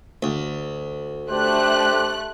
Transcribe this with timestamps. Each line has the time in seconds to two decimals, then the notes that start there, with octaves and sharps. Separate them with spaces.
0.23 D2
1.31 A3 D4 G4 C5 F#6